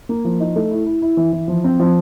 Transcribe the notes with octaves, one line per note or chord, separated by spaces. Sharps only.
A#3
F3
D#4
A3
E4
E4
E4
E3
E3
F3
C4
F3